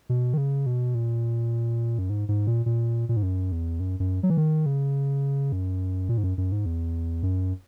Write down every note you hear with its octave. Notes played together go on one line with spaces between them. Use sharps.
B2
D#3
C#3
B2
A#2
F#2
G#2
G#2
A#2
A#2
A#2
G#2
F#2
E2
F#2
F#2
F#3
E3
D#3
C#3
F#2
A#2
G#2
F#2
F#2
G#2
E2
F#2